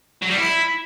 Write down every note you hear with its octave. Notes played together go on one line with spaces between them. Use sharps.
F#3
G3
E4